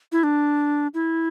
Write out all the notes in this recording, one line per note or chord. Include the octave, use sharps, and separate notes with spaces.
E4
D4
E4